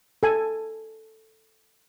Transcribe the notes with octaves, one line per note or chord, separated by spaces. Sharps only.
A4 G#5